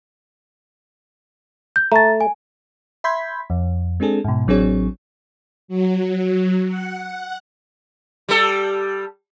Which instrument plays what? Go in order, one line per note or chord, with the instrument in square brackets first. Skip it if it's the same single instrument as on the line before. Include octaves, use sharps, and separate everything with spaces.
[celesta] G6
[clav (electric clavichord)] A3 [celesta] A#5 A6
[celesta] G#5
[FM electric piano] E5 B5 C6 G6 G#6 B6
F2
G#3 C4 D4 G#4 A4
G#2 B2
A1 F#3 C4 D4 G#4 C#5
[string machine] F#3
F#5
[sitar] G3 A4